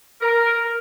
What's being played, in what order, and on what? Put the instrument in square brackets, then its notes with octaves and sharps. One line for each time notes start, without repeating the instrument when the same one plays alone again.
[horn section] A#4